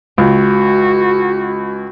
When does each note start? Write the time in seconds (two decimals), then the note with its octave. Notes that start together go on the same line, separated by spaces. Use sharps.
0.18 C#2 F#4